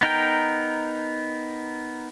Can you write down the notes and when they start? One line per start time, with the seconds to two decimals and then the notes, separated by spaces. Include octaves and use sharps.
0.01 B3 D#4 A#4 G5